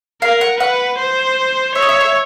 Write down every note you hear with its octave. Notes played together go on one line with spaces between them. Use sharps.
A#4 F5
F#5
B4 F#5
C5
C#5 E5
D#5
E5
E5